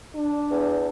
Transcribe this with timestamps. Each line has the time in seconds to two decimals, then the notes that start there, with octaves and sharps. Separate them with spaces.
0.15 D4
0.50 E2